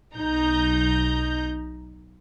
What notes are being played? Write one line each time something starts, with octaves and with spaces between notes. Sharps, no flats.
B1 D#4 A#5 G6